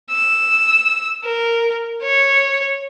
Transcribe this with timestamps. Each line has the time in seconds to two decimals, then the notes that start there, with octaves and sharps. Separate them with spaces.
0.11 E6
1.24 A#4
2.02 C#5